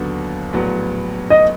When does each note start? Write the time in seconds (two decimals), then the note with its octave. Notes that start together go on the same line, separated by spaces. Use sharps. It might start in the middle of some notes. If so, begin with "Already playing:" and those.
Already playing: D#2 D3 F#3 B3
0.53 A#1 A2 F#3 B3
1.30 D#5